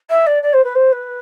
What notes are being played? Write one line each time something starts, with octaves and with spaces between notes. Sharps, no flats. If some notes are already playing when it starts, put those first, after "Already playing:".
E5
D5
D5
C5
B4
C5
B4